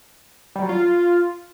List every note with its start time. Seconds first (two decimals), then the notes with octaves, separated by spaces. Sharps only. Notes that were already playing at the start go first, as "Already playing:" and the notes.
0.56 G3
0.62 F#3
0.69 F4